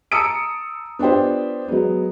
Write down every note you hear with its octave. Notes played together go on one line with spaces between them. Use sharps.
A5 A#5 D#6 E6 C#7 D7
B3 D4 F4 G4 C5
F#3 G#3 B3